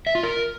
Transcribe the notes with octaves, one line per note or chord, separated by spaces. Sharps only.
E5
F4
A#4